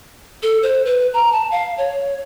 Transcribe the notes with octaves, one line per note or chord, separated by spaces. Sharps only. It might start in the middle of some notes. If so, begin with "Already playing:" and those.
A4
C5
B4
A#5
A5
F5
C#5